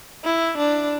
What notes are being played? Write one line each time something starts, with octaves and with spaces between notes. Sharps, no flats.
E4
D4